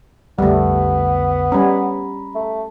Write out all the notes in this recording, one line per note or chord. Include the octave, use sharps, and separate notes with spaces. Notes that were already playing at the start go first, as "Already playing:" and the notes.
B1 F2 D3 G3 A3 B3
G3 C#4 A#5 B5
A3